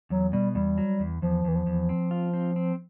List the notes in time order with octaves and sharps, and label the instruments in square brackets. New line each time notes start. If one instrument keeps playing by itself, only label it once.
[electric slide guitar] E2 [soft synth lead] F#3
[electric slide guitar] B2 [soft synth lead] G3
[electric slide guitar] E2 [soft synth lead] G3
[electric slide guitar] F#3
E2
[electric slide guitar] E2 [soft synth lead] F3
[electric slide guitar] E2 [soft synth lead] E3
[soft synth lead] F3
[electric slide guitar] E2
C4
F4
C4
C4